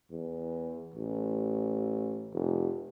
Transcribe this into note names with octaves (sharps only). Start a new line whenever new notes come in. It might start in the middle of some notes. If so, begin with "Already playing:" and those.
E2
A1
F1